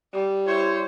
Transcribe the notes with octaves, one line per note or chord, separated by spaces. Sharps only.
G3
E4 C5 C#5